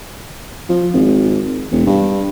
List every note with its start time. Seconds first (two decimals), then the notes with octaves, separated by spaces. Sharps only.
0.69 F3
0.94 G#1
1.72 E1
1.86 G2